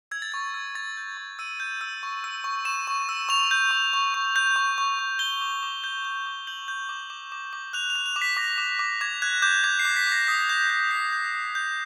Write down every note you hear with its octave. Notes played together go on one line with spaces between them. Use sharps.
E6 G#6
A6
C#6 G#6
E6
C#6 A6
G6
C#6
E6 D#7
G6
E6
C#6
E6
C#6
C#6 E7
C#6
E6
C#6 F7
G6
C#6
C#6
C#6
G6
C#6
C#6
C#6
G6 G7
D6
D6
G6
G6
D6
G6 F#7
G6
D6
D6
D6
D6
F#6 F7
F7
F#6
F7
D6
B6
D6 A#6
D6
D6
D6 G#6
F#6 G#6
D6 G6
D6 G#6
C7
D6
B6
D6 A#6
D#6 B6
G6
G6
G6 C7
G6
D#6
G6